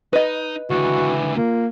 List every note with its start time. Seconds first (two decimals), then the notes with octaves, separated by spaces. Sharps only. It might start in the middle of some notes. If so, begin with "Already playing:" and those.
0.13 D#4 B4 D#5
0.70 C#2 D3 E3 F#4
1.36 A#3 F4